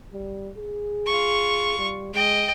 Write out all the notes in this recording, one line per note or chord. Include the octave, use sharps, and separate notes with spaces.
G3
G#4
F4 C#6
G3
G#3 D#5 G5